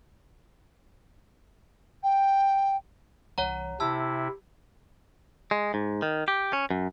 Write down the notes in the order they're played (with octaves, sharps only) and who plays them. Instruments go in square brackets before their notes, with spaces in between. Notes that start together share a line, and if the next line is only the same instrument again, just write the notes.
[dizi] G5
[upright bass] C2 E3 [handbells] C#5 F#5 A#5
[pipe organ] C3 E4 [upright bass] D#4 [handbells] A5 E6
[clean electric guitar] G#3
G#2
D#3
G4
C#4
F#2